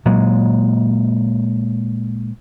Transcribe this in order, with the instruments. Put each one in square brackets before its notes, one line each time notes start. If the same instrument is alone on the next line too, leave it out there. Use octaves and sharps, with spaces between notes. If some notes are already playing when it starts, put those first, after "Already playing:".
[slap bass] A#2 F#3 G#3